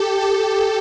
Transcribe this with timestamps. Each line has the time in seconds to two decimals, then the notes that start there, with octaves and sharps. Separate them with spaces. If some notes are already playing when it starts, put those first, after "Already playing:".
Already playing: G4 A4
0.21 A4